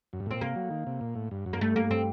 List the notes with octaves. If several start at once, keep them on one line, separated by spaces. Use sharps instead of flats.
F#2
G2
A2
A#2 C4
C3 A#3
F#3
D#3
C3
A#2
A2
G2
F#2
A#3
G2 A3
A#3
C4